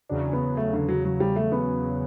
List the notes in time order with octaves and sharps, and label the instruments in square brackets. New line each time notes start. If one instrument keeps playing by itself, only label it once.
[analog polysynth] E2 C#3 F#3 [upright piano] D4
[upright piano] B3
A3
D3
F#3
F#3
G3
A3
B3